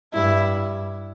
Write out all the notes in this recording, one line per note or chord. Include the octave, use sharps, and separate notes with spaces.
G2 E4